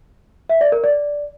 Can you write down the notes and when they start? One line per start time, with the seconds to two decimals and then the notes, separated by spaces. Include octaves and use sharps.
0.50 E5
0.61 D5
0.72 A#4
0.84 D5